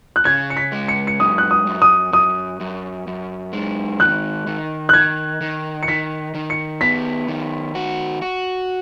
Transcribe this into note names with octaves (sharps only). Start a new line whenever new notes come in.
F#6
C#3 G#6
C#7
B6
G#3
C#7
C#7
F#2 D#6
F#6
D#6
F#2
D#6
F#2 D#6
F#2
F#2
G#3
D#3 F#6
D#3
F#6
D#3 G#6
D#3
C#7
D#3 B6
D#3
C#7
B3 B6
D#3
F#4
F#4